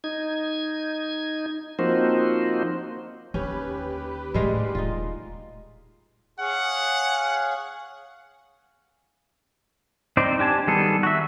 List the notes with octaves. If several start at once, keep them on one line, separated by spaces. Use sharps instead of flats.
D#4 G#6
F3 A#3 C4 D#4 F#4 C5
D#2 D3 C#4 G4 B4
A2 G3 G#3 F5
D#1 D#4 F4
G#4 C#5 F5 F#5
C4 D#4 C5 D5
D4 G4 G#5 A5
D#3 G3 B3 G#4 A4
F#4 E5